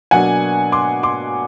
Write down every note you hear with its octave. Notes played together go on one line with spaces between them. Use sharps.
B2 F#3 A#3 D4 F#5 G#5
C6 D6
C6 D6